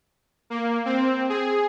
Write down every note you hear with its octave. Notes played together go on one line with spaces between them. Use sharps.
A#3
C4
G#4